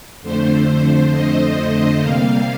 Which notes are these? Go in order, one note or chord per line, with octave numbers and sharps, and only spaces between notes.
F2 D3 A3 C5
D#5
C3 G3 A#3 F5